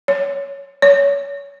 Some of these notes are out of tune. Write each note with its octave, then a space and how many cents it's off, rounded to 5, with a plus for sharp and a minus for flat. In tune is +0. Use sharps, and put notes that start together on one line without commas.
C#5 +10
C#5 +25